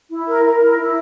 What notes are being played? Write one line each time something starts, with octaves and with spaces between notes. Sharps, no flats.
E4
A#4
A#4
E4
E4